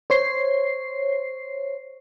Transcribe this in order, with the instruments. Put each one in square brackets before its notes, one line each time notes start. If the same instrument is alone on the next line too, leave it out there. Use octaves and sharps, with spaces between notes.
[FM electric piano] C5 C#5 C7